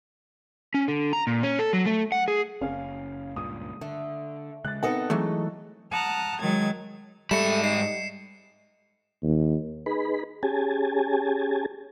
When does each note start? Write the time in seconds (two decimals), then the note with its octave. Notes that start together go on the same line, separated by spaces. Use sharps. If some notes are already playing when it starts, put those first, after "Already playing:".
0.74 C#4
0.88 D3
1.13 A#5
1.27 A#2
1.43 C#4
1.59 A4
1.73 F#3
1.86 A3
2.12 F#5
2.28 G#4
2.61 F#1 C#4 F5
3.36 C#2 G2 A#2 D#6
3.81 D3 A3
4.65 C#3 G#3 F#6 A6
4.83 B3 C4 D#4 A4 D#5 F#5
5.10 E3 F#3 G#3 A3
5.92 F#5 A5 A#5 D#6 F6 F#6
6.41 D#3 F#3 G#3 G#6 A6
7.31 G#2 G3 A3 B5 C#7 E7
7.64 D#4 C7
9.23 D#2
9.86 D#4 G#4 B4 B5
10.43 C#4 G4 G#4 G#5 A5